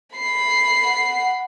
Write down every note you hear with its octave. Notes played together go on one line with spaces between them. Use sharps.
B5 C7
F#5